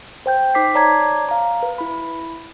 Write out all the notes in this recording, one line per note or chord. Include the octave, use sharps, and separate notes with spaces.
C5 G5 G6
D#4 C5 D6 B6 C7
C#5 D5 A5 A#5 D6 G#6
F5 A#5
B4
E4 B5